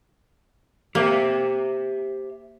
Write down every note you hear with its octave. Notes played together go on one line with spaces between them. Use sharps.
A#3 G4 C5 E5